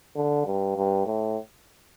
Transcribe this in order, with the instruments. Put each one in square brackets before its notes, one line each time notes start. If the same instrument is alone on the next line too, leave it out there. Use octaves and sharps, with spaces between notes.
[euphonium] D3
G2
G2
A2